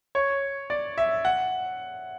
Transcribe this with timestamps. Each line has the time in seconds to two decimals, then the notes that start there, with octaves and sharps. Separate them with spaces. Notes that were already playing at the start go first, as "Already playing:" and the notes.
0.15 C#5
0.70 D5
0.98 E5
1.25 F#5